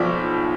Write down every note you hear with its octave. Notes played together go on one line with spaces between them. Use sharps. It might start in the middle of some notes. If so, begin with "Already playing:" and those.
Already playing: B1 F3 D5